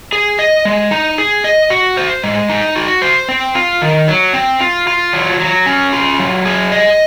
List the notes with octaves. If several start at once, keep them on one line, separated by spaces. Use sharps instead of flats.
G#4
D#5
G#3
D#4
G#4
D#5
F#4
C5
G#3
D#4
F#4
C5
C4
F4
D#3
F#3
C4
F4
F4
F#3
F#3
C#4
F4
F#3
G#4
D#5